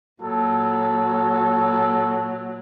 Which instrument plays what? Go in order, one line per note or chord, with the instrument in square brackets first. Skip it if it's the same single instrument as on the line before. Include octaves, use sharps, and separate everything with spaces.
[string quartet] A#2 F#3 [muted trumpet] A4